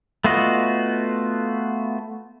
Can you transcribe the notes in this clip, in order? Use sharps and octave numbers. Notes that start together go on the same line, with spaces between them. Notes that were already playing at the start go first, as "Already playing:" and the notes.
A3 B3 F4 F#4 D#5